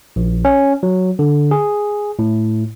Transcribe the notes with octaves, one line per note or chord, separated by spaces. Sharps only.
A#1
C#4
F#3
D3
G#4
A2